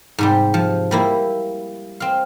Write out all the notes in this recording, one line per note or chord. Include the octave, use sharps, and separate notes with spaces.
G#2 C3 G3
F3
G3 A#3 E4
C4 F5